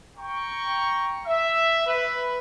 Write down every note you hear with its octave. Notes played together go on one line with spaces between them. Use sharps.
G5 A#5 C#6
E5
B4